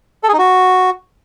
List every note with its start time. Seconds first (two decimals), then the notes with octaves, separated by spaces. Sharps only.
0.23 A4
0.28 G#4
0.33 D#4
0.38 F#4